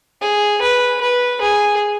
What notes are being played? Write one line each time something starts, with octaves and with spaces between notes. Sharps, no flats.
G#4
B4
B4
G#4